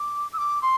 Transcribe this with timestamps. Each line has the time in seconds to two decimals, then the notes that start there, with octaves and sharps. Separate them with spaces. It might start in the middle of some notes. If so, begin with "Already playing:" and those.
Already playing: D6
0.33 E6
0.38 D6
0.62 C6